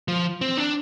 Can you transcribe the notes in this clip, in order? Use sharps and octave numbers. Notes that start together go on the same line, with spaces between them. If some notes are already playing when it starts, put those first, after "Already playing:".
F3
C4
D4